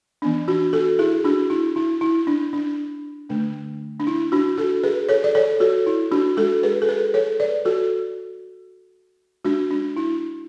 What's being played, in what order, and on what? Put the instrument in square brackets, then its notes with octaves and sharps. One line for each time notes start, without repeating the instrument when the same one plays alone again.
[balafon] E3 B3 D4
D4 F#4
F#4 A4
E4 G#4
D4 F#4
E4
E4
E4
D4
D4
D3 A3 D4
D4
E4
D4 F#4
F#4 A4
G#4 B4
A4 C#5
D5
A4 C#5
F#4 A4
E4
D4 F#4
G#3 D4 F#4 A4
G#4 B4
A4
G#4 B4
A4 C#5
B4 D5
F#4 A4
G#3 D4 F#4
D4
E4